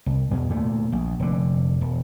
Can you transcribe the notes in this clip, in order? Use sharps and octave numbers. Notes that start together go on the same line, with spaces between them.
C2
E2 B2
D2 A#2 A3
A#1
F1 D3
E1